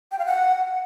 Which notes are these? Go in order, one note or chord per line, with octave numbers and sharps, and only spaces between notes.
G5
F5
F#5